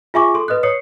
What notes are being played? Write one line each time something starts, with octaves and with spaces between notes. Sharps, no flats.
F4 G#4 E5 G#5 C#6 D6
A4 C6
B4 D#5 D#6 F#6
C#5 D#6 C7 C#7